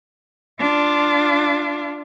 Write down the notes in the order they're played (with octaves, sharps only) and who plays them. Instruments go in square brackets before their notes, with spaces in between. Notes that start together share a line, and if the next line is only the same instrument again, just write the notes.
[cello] D4 F4